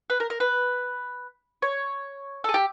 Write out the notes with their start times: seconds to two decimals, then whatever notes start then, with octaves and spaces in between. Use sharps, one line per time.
0.10 B4
0.20 A#4
0.30 A#4
0.40 B4
1.62 C#5
2.44 G#4 A4
2.54 G4